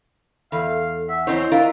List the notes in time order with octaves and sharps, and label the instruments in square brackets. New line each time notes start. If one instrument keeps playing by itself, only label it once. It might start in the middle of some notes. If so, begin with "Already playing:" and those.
[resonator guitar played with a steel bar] E2 [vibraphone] A4 [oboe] F5
[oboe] E5 [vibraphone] F#5 G#5
[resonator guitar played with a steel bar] E2 C4 C#5 [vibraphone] E4 D#5 [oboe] C5
[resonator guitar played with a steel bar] D4 F4 A#4 [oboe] E5